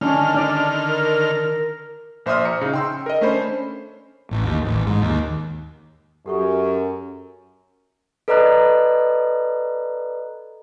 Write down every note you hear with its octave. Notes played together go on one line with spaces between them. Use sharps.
D3 D#3 C#4 D4 F6
D4 D5 A5
A#4
A#1 C5 E5 C6 D#6 F6
A#5 C#7
C#3 D#4
G5 C6 E6
A#4 D#5
A3 C#4 D4 C5 B5
A1
D#2
A1
G#2
D#2
F#2 G4 A4 C#6
A4 B4 D5 D#5 A#5 F#6